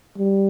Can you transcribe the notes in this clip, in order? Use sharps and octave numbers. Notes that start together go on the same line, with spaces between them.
G3